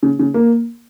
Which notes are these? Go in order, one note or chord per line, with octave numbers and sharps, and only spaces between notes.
C#3
C#3
A#3